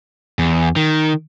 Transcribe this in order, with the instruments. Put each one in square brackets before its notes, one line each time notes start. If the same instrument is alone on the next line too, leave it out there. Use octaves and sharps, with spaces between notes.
[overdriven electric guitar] E2
D#3